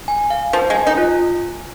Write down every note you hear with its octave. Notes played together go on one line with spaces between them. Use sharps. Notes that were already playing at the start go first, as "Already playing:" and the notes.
G#5
F5
F3 C5
G#3
G#5
D#4
F4